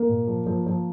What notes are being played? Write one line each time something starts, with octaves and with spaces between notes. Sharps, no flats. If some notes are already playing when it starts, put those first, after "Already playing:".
Already playing: A#3
A#2
F3
F3
F3